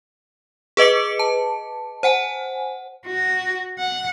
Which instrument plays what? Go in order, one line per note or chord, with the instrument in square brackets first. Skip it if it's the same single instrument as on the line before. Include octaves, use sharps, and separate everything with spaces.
[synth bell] G#4 B4 D#5 D6 C#7
A5
C5 F#5 G#5
[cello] F#4
F#5